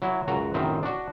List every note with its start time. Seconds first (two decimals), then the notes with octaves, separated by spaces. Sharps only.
0.02 F#3 E4 F#4
0.27 C#2 F#2 F#4 A#5
0.54 F#2 A2 D#3 C4 E5
0.83 D4 F#4